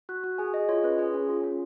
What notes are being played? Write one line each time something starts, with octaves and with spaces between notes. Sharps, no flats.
F#4 F#6
F#4
G#4 G#5
G#4 D#5
F4 C#5
C#4 B4
G#4 C#5
C#4
F4
C#4